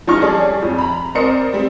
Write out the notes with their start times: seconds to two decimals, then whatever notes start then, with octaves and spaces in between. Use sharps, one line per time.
0.07 F3 C#4 D#4 C#6 F6
0.22 G3 G#4 A4 C#5 D5
0.62 F2
0.78 A#5 B5
1.15 C4 A#4 C5 D5 D#6 C#7
1.53 G3 C4